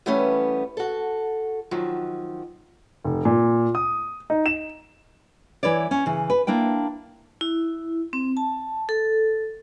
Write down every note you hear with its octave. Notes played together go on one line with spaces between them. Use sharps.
E3 G3 A3 B3 C#4
F#4 A4
D#3 F3 F#3
F1
A#2
D#6
D#4
E7
E3 E4 B4 C#5 D5
C#4
C#3 E3
B4
A#3 D4 E4 G5
E4
C4
A5
A4